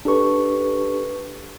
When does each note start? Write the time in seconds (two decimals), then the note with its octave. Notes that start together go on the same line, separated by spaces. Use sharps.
0.05 D4 G4 A4 B4 C#6